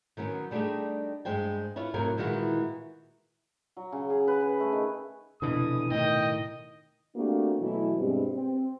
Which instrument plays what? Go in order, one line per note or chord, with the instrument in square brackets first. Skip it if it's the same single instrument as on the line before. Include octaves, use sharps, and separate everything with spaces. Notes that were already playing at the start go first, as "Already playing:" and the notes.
[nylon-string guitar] D#3 F#3 B3 C#4
G3 A3 D4 D#4 G4 G#4
G2 G#3 C5 G5 G#5
E4 F4 B4 C#5
A2 C3 F#3 F#4 A#4 G#5
A#2 D#3 E3 G#3 E4 F#4
[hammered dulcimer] F#3
C#3
G#4
B4
B4
A3
D#3
[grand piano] F1 B2 [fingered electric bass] D3 E3 [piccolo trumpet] D#6
[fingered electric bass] A2 D#3 [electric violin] D#5 [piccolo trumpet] G5
[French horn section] A3 A#3 C4 D4 F#4 G4
B2 E3 F#3 A3 E4
G2 B2 G3 G#3 C4 G4
C4